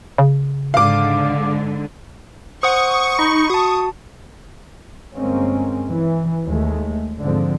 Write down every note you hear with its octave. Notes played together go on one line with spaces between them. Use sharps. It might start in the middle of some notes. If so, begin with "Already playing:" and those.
C#3
G#2 D3 F5 D6
C5 F#5 C#6 D#6
D#4 B5
F#4 A5 D#6
G1 G#3 A#3 C4 C#4
E3
D#2 G#3 A3
G#2 D3 F3 C4